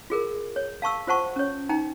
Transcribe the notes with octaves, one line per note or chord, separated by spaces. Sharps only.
F4 G#4 A#4
C#5
F5 A5 C#6 E6
F4 C5 F#5 A5 C#6
C#4 C#5
D#4 G5 A#5